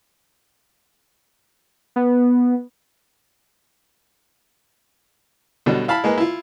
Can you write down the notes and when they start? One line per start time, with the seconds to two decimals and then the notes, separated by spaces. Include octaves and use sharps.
1.96 B3
5.66 B2 D3 F#3 G3
5.88 E4 F5 A5 B5
6.04 G#3 A#3 B4
6.18 E4 F4